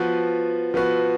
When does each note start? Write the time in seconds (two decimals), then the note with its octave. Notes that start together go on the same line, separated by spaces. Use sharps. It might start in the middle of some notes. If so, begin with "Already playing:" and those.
Already playing: F3 B3 F#4 B4
0.74 F3 B3 F#4 B4